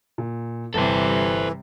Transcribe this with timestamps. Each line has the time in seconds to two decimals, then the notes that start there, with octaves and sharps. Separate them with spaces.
0.18 A#2
0.74 G1 C3 E3 G3 A4 C5 A5 D6